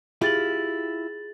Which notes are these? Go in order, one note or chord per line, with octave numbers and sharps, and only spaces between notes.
E4 F4 G4 G#4 A6 F#7